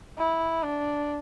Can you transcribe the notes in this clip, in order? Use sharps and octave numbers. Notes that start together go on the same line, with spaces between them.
E4
D4